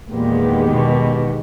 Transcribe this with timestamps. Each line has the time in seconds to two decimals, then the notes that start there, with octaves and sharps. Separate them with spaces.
0.12 E2 A#2 D#3 G#3 B3 G4
0.70 B2